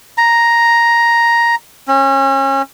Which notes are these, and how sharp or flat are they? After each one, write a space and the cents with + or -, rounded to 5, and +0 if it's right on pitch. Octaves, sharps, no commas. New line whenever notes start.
A#5 +5
C#4 -30